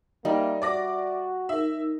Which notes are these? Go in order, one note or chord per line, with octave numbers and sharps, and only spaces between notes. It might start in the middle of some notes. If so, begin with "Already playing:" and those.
G3 A#3 D#4 E5
F#4 D5 D6 A#6
D#4 A#4 E5